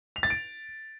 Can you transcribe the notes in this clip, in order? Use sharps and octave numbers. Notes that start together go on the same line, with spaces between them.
F7
A6
D7